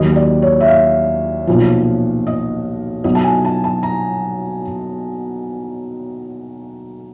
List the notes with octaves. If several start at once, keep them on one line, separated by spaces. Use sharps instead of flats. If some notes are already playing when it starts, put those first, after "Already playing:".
Already playing: D#2 D#3 F#3 D#5
D5
C#5
E5
F5
B1 A#2 F3
D#5
B1 B2 F#3 D#5
A5
G#5
A5
A5
A#5